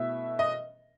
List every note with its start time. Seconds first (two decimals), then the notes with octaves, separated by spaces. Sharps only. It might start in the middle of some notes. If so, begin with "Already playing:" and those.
Already playing: B2 A3 E4 E5
0.39 D#5